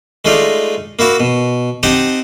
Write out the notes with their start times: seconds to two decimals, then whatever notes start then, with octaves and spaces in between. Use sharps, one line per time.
0.25 G#3 A3 D#4 F4 D5
0.99 A#3 E4 F#4 E5
1.20 B2
1.83 C4 D#4 G4 F#5 G5 A5